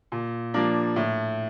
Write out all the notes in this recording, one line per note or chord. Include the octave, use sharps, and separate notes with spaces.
A#2
F3 A#3 D4
A2